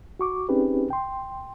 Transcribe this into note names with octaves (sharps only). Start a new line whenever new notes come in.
F#4 C#6 D6
C4 C#4 D#4 G4 G#4 B4
G5 C6